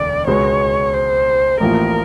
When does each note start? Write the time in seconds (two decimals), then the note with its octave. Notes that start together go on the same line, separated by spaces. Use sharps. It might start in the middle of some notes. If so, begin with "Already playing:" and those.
Already playing: E1 D2 D5
0.27 C#2 B2 G#3 B3 C#5
0.94 C5
1.60 A1 A2 F3 A#3 A#4